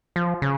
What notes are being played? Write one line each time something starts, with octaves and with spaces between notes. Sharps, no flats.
F3
C#3